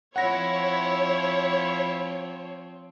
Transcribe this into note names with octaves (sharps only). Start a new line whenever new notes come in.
F3 C4 E4 C#5 F#5 A#6